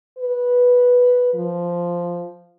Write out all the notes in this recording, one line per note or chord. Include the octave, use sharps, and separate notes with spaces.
B4
F3